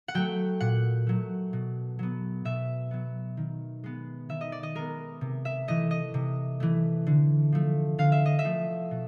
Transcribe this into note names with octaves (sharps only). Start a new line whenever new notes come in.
F#5
F#3 A3 G5
A#2 F#5
F#3 A3
B2
F#3 B3
B2 E5
F#3 B3
D#3
G#3 B3
D#3 E5
D#5
D5
D#5
G#3 B3 A#4
C3
E5
E3 A3 D#5
D#5
C3
E3 A3
D3
F3 A3
D3 F5
E5
D#5
E5
F3 A3
B2